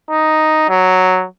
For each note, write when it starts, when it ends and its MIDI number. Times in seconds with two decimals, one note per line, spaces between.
0.10 0.66 63
0.69 1.25 54